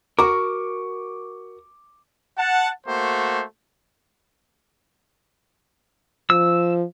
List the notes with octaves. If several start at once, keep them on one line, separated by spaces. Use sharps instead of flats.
F#4 A#4 C#6 D6
F#5 A5
A3 A#3 F#4 C5
F3 E6